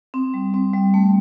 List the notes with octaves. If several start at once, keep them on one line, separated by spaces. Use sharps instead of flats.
C4
G3
C4
G3
A3